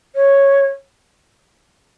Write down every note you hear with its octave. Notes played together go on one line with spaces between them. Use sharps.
C#5